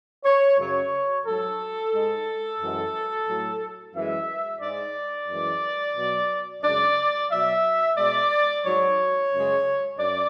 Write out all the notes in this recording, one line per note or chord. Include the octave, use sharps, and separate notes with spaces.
C#5
F#2 C#3 F#3 C#5
G#2 F#3 A4
G#2 G#3
F#2 E3 G#3
A2 F#3
F#2 E3 G#3 E5
G#2 G#3 D5
F#2 E3 G#3
B2 F#3
F#2 C#3 G#3 D5
B2 F#3 E5
B2 G#3 D5
G#2 F#3 C#5
F#2 C#3 G#3
F#2 D5